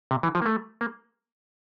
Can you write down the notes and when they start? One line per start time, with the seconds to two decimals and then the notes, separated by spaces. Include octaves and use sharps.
0.11 C3
0.23 E3
0.35 F3
0.42 A#3
0.46 A3
0.81 A#3